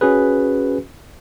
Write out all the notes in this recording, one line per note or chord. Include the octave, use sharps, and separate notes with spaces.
C#4 F#4 G#4 B4